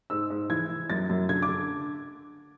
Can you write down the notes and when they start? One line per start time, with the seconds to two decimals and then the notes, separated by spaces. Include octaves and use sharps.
0.10 G#2 E6
0.30 G#2
0.49 E3 G#6
0.69 E3
0.90 F#2 A6
1.09 F#2
1.29 D3 G#6
1.42 D6
1.48 D3